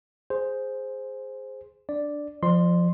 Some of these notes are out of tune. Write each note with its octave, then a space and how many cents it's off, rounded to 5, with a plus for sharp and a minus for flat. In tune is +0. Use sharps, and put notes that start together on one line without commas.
G#4 +0 C5 +0
D4 +0 D5 +0
F3 +0 D5 +40 C6 +0